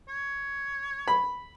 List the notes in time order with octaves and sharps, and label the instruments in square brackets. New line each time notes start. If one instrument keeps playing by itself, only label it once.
[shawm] C#5
[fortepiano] B5